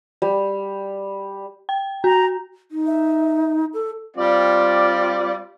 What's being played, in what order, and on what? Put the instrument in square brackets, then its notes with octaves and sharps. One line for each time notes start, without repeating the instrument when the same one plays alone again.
[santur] G3
[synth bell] G5
[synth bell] F#4 [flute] A#5
[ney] D#4
[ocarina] E5
[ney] A4
[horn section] G3 C4 F4 D5